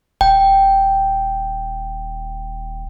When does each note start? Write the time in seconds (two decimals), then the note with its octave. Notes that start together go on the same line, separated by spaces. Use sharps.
0.21 D#1 G5